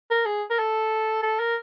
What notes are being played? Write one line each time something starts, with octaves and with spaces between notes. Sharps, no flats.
A#4
G#4
A#4
A4
A4
A#4